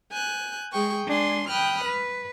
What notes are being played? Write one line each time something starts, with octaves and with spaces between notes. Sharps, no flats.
G#5 F#6 G6
G#3 G#4 G5 C#6
G#3 D4 G#5 C6
G5 B5 D#6 F6 F#6
B4